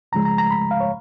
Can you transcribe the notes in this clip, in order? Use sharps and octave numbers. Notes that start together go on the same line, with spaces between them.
C#2 C#3 F3 G#3 A#5
A#5
A#5
B5
F5
C#5